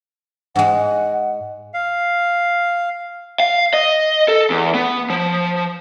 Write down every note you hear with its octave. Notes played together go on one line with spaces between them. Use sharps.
G#2 G#3 F#5
F5
F5
D#5
A4
E2
B3
F3